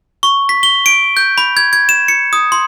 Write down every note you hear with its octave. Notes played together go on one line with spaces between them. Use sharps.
C#6
B6
G7
D7
G6
B5
G#6
G#6
E7
C#7
D#6
C6